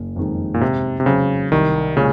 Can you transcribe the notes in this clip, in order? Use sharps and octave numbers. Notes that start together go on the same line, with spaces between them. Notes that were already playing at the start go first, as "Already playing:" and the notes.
Already playing: F#1
F2 D#3 G#3
A#2
G#2 C3
C3
C#3 F#3 C4
C2 D#3
A#2 C#3 G#3 C#4